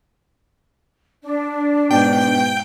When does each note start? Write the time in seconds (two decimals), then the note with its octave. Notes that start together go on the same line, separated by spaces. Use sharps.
1.24 D4
1.91 G#2 B2 G5